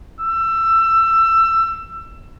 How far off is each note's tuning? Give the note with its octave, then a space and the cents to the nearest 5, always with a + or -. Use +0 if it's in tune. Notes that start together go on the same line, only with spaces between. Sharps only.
E6 +20